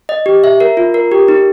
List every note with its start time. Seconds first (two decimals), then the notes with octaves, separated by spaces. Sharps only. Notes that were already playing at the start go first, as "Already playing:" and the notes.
0.09 D#5
0.26 G4
0.44 E5
0.60 A#4
0.77 F4
0.94 A#4
1.12 G4
1.28 D#4